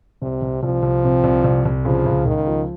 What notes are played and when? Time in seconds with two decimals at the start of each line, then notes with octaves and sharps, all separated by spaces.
0.22 C2 C3
0.42 C2
0.63 C2 F3
0.83 C2
1.04 C3
1.24 C2
1.44 C2
1.65 C2
1.85 C#3 F3
2.06 C#2
2.25 C#2 D#3
2.47 F3